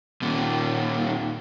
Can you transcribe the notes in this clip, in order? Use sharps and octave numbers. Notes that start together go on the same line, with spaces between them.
D#2 A#2